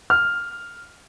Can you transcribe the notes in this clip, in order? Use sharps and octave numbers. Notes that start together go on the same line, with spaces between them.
F6